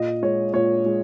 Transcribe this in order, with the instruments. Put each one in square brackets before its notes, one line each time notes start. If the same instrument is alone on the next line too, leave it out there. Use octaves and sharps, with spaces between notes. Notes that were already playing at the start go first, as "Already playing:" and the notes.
Already playing: [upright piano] A#2 D#5
G#3 C#5
A#2 C#5
G#3